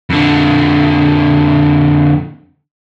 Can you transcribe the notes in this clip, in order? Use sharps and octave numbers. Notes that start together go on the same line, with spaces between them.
F2 D3